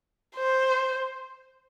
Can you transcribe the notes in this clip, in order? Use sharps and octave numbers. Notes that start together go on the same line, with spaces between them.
C5